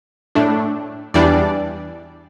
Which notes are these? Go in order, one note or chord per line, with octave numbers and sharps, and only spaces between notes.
A2 A3 D4
E2 E3 G3 D4 D5